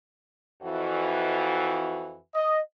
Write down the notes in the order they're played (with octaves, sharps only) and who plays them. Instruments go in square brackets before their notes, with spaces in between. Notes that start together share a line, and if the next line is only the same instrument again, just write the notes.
[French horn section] F2 E3 F#4
[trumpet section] D#5